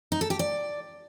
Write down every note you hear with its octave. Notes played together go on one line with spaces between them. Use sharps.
D#4
A4
G4
D5